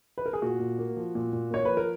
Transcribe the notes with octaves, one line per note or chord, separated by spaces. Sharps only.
B4
A#4
G#4
A#2 F#4
A#2
A#3
F3
A#2
A#2
A#3 C#5
F3 B4
A#4